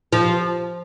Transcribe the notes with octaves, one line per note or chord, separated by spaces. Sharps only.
F3